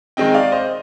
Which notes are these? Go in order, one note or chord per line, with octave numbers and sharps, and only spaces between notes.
D#3 G#3 C4 D#5 G5
D5 F5
C5 D#5